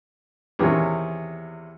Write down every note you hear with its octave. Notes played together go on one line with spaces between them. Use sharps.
E2 C3 D#3 C#4